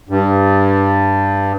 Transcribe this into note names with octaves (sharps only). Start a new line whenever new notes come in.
G2